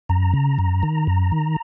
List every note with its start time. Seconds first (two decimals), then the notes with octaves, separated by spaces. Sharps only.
0.09 F#2 A#5
0.33 C#3
0.59 F#2
0.83 D#3
1.07 F#2
1.32 D#3